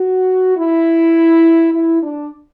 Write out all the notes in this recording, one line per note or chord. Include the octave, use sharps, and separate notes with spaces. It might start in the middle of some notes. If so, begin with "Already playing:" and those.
Already playing: F#4
E4
E4
D4